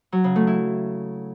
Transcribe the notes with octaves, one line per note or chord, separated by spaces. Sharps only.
F#3
C#3
A3
E4